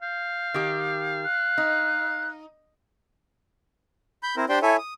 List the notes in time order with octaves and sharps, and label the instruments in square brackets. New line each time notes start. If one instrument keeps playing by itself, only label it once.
[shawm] F5 [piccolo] G6
[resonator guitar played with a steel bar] D#3 G4
[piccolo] F#6
[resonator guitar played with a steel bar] D#4
[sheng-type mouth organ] B5 G6
C4 E4 A#4 C5
D4 G4 C5 D5 G5 C6
E4 A4 C#5 E5 G#5
D#6